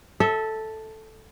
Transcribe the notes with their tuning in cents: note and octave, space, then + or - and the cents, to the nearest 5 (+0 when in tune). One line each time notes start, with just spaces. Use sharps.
A4 +0 E5 -25